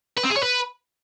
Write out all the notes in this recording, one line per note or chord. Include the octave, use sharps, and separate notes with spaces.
B4
C4
G#4
C#5
B4